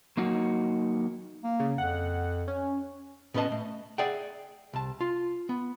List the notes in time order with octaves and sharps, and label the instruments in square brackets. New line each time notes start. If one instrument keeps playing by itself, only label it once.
[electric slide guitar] F#3 A#3 D#4 F#4
[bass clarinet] A#3
[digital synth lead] C#3
[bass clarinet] F2 [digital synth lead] F#5
[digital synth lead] C#4
[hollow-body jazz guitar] A2 B3 C#4 B4 D#5 A5
A3
G#4 D5 E5 F#5 G5
C2 A5
F4
B3